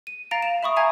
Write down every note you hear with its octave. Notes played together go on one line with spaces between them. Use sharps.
D#7
F5 A#5 A6 A#6 D7 F7
E7
E5 B5 C#6 D#6
E5 F5 G#5 A#5 G#6